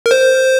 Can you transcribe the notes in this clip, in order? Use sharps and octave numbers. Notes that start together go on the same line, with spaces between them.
A#4
C5